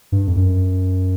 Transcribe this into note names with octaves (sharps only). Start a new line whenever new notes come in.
G2
F2
F#2